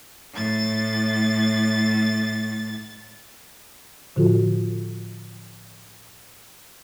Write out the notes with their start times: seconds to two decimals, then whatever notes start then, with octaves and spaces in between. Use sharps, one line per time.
0.34 A2 A6
4.16 A2 D3 F3 F4 F#4 A4